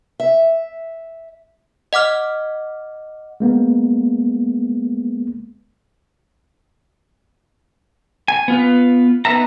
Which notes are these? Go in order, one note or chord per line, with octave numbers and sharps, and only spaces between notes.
E5
D#5 F#5 D6 F6
G#3 A#3 B3
G#5
B3 F4 B4
B3 D#4 B4 E5 A#5